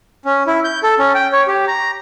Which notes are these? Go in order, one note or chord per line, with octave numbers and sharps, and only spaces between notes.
C#4
E4
G6
A4
C#4
G5
C#5
G4
A#5